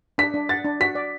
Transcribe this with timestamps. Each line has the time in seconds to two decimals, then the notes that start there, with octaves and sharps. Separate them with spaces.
0.18 D4 B6
0.34 D4
0.49 F#5 A6
0.64 D4
0.80 F#4 B6
0.95 D5